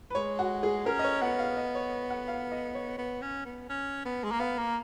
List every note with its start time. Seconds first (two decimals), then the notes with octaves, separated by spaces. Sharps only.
0.10 B4
0.15 G#3 C#5
0.39 F#4
0.63 G#4
0.86 C#4 A#4
0.99 D#5
1.04 C#5
1.21 B3 F#5
1.39 F5
1.57 D#5
1.75 C#5
2.10 F#5
2.28 F5
2.52 D#5
2.75 C#5
2.98 B3
3.22 C#4
3.45 B3
3.69 C#4
4.05 B3
4.24 G#3
4.31 A#3
4.40 B3 F5
4.58 A#3